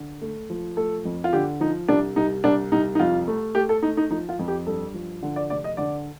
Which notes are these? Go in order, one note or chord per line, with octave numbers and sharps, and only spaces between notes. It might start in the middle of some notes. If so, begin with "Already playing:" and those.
Already playing: D3
A3
F3
A3 A4
F2
F4
D3 G4
F3 D#4
C2 D4
C2 D#4
C2 D4
C2 D#4
D#4
F2 F4
A3
A3 G4
A4
A3 D#4
D#4
F3 D#4
F4
F2
G4
G2 A4
F3
D3
D5
F1 D5
D#5
D3 D5